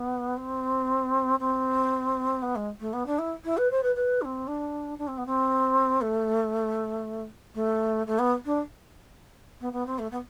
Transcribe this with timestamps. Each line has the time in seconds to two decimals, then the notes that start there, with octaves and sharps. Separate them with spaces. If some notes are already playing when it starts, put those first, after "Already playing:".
Already playing: B3
0.37 C4
1.39 C4
2.42 B3
2.55 G#3
2.80 A3
2.93 B3
3.06 D4
3.18 E4
3.44 E4
3.57 B4
3.71 C5
3.83 B4
3.95 B4
4.21 D4
4.25 C4
4.47 D4
4.98 D4
5.07 C4
5.18 B3
5.26 C4
6.01 A3
7.54 A3
8.07 A3
8.19 B3
8.45 D4
9.60 B3
9.73 B3
9.86 C4
9.98 A3
10.11 B3